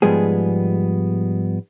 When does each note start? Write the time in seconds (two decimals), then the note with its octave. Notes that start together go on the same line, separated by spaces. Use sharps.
0.02 G#2 F3 G3 G#3 B3 G#4